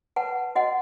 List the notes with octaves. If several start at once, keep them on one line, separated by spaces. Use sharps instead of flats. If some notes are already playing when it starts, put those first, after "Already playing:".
B4 F#5 A5
F#4 D#5 F#5